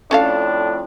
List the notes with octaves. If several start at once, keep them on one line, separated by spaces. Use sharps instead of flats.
F2 A2 C#4 D4 A4 F5